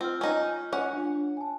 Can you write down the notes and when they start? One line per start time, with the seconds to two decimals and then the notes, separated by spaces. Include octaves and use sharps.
0.01 C4 F4 F6
0.21 C#4 D#4
0.73 C#4 F#5
0.93 D4 F4
1.37 G#5 A5